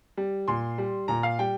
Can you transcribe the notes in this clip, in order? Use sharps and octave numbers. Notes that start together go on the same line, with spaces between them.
G3
A#2 C6
G3
A#2 A#5
F5
G3 G5